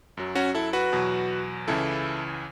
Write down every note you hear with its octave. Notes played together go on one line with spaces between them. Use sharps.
F#2 F#3
C#4 F#4
E4 A4
F#4 B4
E2 B2 F#3
C#2 C#3 E3 E4 A4